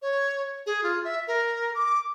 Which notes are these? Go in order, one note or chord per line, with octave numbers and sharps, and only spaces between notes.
C#5
G#4
F4
E5
A#4
D6